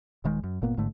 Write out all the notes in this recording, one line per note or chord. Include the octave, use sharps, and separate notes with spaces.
D#1 D#3 G#3
F#2
G1 A#2 A#3 B3
A1 G#2 D3 A3